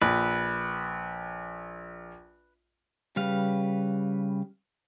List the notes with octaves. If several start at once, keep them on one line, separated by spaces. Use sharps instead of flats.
A#1 B4
C#3 G3 B4 F5